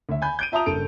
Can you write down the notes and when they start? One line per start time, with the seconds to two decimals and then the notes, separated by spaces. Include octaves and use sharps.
0.09 D2 E5
0.22 G#5 B5 G6
0.39 G6 D7 D#7
0.52 F4 E5 A5 A#5 D#6 F7
0.66 F#1 G2 A4 D7